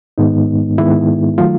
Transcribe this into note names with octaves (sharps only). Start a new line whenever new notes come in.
G#2 D#3 G#3 B3 D#4
G#2 D#3 G#3 B3 E4
D#3 F#3 A3 F4